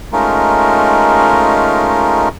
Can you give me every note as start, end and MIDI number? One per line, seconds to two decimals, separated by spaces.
0.13 2.28 56
0.13 2.28 57
0.13 2.28 61
0.13 2.28 63
0.13 2.28 65
0.13 2.28 70